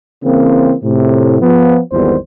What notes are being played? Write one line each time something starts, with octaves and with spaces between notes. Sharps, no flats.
C#3 E3 A#3 C4
A2 C3
F3 B3
G#1 E2 D#3 G3 B3 C5